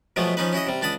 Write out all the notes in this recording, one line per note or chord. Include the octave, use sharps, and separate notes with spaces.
B2 F3 F#3 G#3 A3 B3
F3 C#4 D#4 B4
C#4 E4 F#4 D#5
C3 G3
C#2 D4 A5 B5 D#6